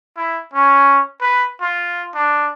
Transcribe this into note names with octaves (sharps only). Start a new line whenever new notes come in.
E4
C#4
B4
F4
D4